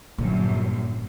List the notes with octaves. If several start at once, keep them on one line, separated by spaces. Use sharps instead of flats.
G1 F#2 A#2